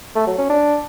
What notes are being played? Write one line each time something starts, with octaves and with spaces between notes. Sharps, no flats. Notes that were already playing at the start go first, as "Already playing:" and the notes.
A3
F#3
C#4
D4